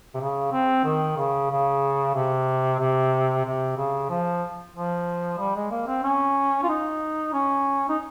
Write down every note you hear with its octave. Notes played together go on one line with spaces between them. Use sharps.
C3
C#3
C4
D#3
C#3
C#3
C3
C3
C3
C#3
F3
F3
G3
G#3
A#3
C4
C#4
F4
D#4
C#4
D#4